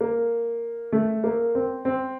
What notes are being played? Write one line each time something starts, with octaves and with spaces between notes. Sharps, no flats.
A#3
A3
A#3
C4
C4